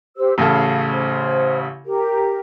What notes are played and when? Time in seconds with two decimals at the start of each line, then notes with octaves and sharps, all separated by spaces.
0.17 G4 C5 E6
0.38 A1 C#3 A4 F5
0.92 C5
1.85 G4 A#4